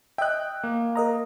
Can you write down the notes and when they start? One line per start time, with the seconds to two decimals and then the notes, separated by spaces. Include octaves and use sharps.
0.18 D#5 E5 G5 F#6
0.64 A#3
0.96 A#4 D#5 A#5